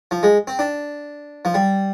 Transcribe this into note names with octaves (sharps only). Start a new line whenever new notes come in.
F3
G#3
C4
D4
F3
G3